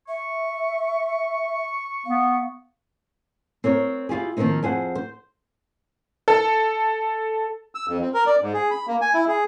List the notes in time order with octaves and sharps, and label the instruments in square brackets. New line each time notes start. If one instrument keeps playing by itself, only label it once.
[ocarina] E5 [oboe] C#6
[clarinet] B3 [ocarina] F5
[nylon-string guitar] C4 A#4 C#5
E4 F4 G4 G#4
D#3 F3 A3 A#3 C4 D#4
F2 G#4 C5 F#5
C5
[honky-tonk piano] A4
[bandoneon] E6
F2
C4
A#4
D5
G#2
G#4
B5
A#3
G#5
E4
G#4